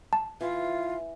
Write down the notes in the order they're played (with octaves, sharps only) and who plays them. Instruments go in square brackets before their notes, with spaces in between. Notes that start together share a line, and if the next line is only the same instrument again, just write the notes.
[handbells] A5
[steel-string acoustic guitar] E3 [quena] F4